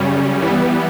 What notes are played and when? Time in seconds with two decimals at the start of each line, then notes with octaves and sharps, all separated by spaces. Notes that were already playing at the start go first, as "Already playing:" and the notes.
Already playing: F#2 C#3 G3 C#4
0.42 E3 G3 B3